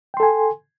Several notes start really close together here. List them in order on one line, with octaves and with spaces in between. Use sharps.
G5 C6 A4 G#5